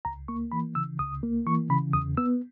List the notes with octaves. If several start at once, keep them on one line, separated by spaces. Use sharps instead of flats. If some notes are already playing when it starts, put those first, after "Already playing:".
C#2 A#5
A#3 C#6
E3 B5
C#3 E6
C#2 D#6
A#3
E3 C#6
C#3 B5
E2 D#6
B3 E6